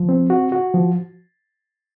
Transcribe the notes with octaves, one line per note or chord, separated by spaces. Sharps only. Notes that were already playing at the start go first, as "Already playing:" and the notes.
Already playing: F3
C4
F#4
F#4
F3